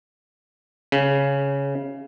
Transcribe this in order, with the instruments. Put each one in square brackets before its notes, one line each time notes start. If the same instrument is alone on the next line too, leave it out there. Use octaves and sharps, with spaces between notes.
[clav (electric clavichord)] C#3